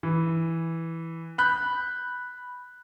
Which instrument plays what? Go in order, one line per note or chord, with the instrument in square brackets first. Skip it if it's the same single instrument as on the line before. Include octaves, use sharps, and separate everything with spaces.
[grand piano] E3
B5 F#6 G6